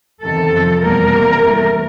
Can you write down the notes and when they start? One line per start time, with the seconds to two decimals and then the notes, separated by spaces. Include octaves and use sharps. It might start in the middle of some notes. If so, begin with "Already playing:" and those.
0.22 E2 C3 D#3 A4
0.52 F2 C3 F3
0.82 E2 B2 G3 A#3 A#4
1.12 C3 E3 G3 A#3
1.41 G2 E3 A3